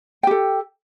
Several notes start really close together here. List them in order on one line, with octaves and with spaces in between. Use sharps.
G5 G4 A4